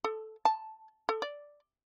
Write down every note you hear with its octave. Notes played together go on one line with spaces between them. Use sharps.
A4
A5
A4
D5